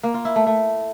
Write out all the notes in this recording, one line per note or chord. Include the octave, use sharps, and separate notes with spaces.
A#3
F4
E4
A3
A3